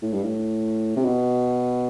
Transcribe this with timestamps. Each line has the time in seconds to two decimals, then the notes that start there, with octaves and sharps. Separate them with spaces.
0.02 A2
0.13 G2
0.23 A2
0.96 C3
1.04 B2